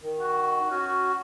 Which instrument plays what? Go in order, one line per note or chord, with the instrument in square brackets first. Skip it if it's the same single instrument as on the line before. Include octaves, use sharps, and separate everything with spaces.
[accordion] D#3
[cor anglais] F#4
[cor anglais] C#4 [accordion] F#4